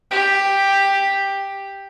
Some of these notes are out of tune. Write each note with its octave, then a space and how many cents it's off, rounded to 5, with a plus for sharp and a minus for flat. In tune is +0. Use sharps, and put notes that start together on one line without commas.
G4 +5